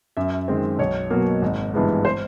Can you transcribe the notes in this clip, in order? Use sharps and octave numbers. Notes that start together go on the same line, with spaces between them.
F#2 E5
D#3 G#3 C4
B1 C#5
B2 F#3 A#3
G#1
G2 E3 G#3 B3
C5